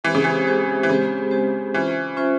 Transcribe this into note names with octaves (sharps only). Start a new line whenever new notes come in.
E3 G#3 C4 G4 C5
C#3
E3
G#3 C4 G4 C5
E3
C#3 G#3 C4 G4 C5
G#3 C4 G4 C5
E3 C#4 F4 C5 E5
C#4 F4 C5 E5